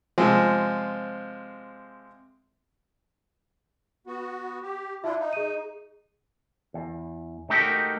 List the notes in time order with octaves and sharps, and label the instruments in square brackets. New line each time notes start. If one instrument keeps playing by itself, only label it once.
[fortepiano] C3 F3 G#3 C4
[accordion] B3 F#4
G4
[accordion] D4 E4 F4 [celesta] E5
[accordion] D#4
[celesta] G#4 D#7
[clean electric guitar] E2
A3 D#4 F#4 G4 A#4